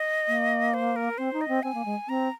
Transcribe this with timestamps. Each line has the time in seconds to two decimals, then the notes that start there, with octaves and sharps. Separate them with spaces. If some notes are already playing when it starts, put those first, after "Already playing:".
Already playing: D#5
0.28 A#3
0.74 C5
0.96 A#4
1.18 C4 C5
1.33 D#4
1.41 D#5
1.48 C4
1.63 C4 G#5
1.74 A#3
1.85 G#3
2.08 C4 A#5